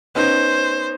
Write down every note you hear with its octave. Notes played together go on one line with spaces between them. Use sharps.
B3 C#4 D#4 C5